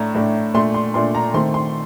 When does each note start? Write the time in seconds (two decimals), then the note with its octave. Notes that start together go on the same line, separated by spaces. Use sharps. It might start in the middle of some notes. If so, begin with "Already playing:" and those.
Already playing: A2 A3 D4 A#5
0.15 A2 A3 D4
0.54 A#2 A3 D4 C6
0.74 C6
0.94 A#2 A3 D4 C6
1.15 A#5
1.34 D#3 A3 C4 C6
1.54 C6